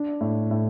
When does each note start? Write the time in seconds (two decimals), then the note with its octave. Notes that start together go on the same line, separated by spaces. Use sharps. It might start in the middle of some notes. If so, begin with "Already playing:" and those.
Already playing: D4
0.21 A2
0.51 A2